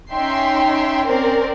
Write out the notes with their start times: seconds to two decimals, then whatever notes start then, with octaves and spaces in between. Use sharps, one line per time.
0.11 C#4 D#4 E5 G5 C6
1.07 C4 C#4 A#4 C5 D5